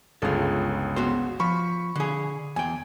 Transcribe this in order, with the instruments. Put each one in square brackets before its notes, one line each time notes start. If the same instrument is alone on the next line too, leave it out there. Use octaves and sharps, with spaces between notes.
[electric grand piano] G1 C#2 G#4 [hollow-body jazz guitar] F4 A4
[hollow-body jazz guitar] B3 F#4 C5
[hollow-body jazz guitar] F3 [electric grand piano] B5 C#6
[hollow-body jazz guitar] D3 G#4
[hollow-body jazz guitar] E2 G5 [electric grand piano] G#5